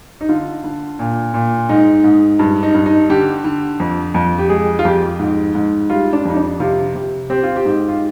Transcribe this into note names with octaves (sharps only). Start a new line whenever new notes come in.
D#4
D3 F4
D3
A#2
A#2
G#2 D#4
G#2
G2
D#4
G2
D#4
D3 G4
D3
F2
F2
G4
G#3 G#4
F4
F2 G4
G#2
G#2
G3 F4
D4
F2 D#4
D4
C3 F4
C3
C4 G4
F4
G4
G#2
F4